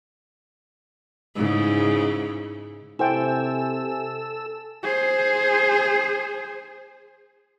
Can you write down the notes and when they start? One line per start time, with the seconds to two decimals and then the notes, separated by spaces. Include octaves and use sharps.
1.36 G#2 C#3 E4
2.99 C3 E4 A4 C5 G5 G#5 E6
4.83 G#4 C5